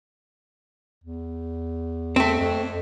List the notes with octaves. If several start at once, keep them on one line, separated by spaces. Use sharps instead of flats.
E2
A3 C4
F2